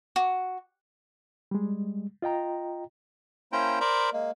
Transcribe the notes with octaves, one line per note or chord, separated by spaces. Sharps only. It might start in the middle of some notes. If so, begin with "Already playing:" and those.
F#4
G3 G#3
F4 D#5 G5 A#5
A#3 C#4 E4 C5 G5 A#5
A#4 C5 D5 A#5 B5
G#3 A#3